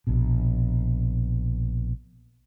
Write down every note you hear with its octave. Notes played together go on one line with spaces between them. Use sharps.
A#1 B2